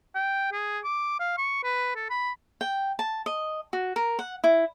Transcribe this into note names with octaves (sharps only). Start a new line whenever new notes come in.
G5
G#4
D6
F5
C#6
B4
A4
B5
G5
A5
D#5
F#4
A#4
F#5
E4